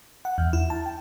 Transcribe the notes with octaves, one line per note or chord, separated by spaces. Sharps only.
F#5
E2
E4
A5
G5